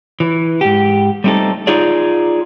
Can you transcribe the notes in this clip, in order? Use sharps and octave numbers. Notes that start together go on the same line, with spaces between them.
E3
G#2 G4
G3 A3 C4 D#4 A4
D#4 F4 G#4 D5